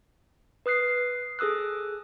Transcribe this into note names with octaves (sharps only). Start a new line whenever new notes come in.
B4 D#6 F#6 C7
G#4 A4 D#6 E6 F#6